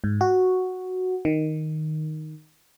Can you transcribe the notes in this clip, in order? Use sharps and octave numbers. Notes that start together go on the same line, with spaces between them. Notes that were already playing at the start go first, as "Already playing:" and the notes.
G#2
F#4
D#3